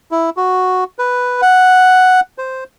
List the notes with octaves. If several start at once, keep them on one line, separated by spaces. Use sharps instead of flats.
E4
F#4
B4
F#5
C5